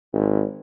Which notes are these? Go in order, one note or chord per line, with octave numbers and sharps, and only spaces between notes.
G#1